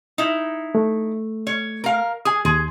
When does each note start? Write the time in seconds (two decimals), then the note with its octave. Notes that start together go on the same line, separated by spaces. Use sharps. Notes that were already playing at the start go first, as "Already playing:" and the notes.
0.18 D#4 E4
0.75 A3
1.47 C#5
1.84 A#4 F5
2.25 G#4 G#5 D#6
2.45 D#2 G#4 C6